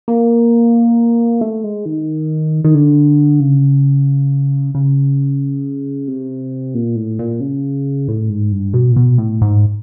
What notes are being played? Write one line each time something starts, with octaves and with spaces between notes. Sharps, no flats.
A#3
A3
G#3
D#3
D#3
D3
C#3
C#3
C3
A#2
A2
A#2
C#3
A2
G#2
G2
B2
A#2
B2
A2
G#2